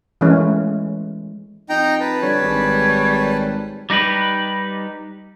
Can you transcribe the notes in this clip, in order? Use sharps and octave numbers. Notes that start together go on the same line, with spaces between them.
E3 G#3 A3 C#4
F2 D#4 G5 A#5
B4 A5
D3 G3 C#5
G#1
G3 D#4 G4 B4